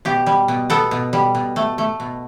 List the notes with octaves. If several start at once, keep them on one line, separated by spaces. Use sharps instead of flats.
B2 G4
G3
B2
B3 A4
B2
G3
B2
A3
A3
B2